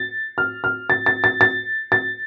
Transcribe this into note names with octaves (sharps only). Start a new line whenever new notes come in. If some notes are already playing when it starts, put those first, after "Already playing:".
Already playing: A6
F6
F6
A6
A6
A6
A6
A6